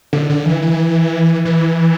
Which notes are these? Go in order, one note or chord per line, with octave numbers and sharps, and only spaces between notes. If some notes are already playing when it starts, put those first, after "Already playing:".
D3
D3
E3
E3
E3